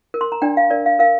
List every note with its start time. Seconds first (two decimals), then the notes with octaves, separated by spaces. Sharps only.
0.14 A#4
0.21 C6
0.32 A#5
0.42 D4 D5 G5
0.57 F5
0.70 A#4 D5
0.86 F5
0.99 A#4 F5